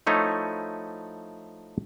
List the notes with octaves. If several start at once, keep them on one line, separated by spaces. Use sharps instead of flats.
F3 A3 D#4 E4 C#5